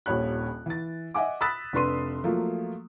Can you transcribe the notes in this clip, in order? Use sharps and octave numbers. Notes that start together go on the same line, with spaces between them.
D#1 A#1 D#2 C#5 B5 F#6
E3 A6
D#5 E5 F#5 G#5 D6
B5 D#6 E6 F#6 A6 B6
F1 D4 B4 C6 D#7
F3 F#3 A3 A#3 F4